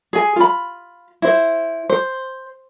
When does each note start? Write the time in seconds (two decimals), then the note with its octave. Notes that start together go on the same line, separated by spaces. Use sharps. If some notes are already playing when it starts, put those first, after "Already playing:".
0.13 G#4 G#5
0.36 F4 B5
1.22 E4 C5
1.90 C5